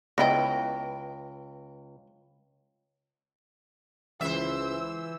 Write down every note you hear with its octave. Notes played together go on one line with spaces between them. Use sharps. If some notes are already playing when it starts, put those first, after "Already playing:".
C#2 B3 E4 D#5 G5 A#6
C#2 E3 C5 E5 E6